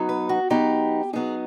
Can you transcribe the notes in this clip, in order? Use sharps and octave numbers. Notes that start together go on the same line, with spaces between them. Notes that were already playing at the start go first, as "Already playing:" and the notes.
Already playing: F#3 B3 D#4
B4
F#4
F#3 B3 D#4 G4
F#3 B3 D#4 G#4